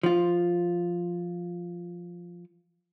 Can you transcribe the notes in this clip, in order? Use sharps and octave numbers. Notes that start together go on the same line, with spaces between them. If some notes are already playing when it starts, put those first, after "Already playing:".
F3 F4